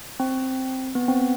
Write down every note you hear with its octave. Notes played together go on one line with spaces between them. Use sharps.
C4
B3
C4
B3